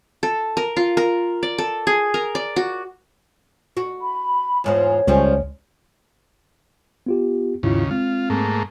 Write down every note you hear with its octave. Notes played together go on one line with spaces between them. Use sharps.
A4
A#4
F4
A#4
D5
A4
G#4
A#4
D5
F#4
F#4
B5
E2 G#2 F3 C#5
C#2 F3 G3 C#4
B3 F4 G4
D#2 G#2 C#3 E4 F4
G#3 C4 F4
G#2 A3 A#3